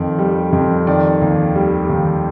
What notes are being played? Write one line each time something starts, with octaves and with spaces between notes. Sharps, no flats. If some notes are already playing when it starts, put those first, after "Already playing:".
Already playing: F2 D#3
G3
F2
D#3 D5
D#2
G3
D#2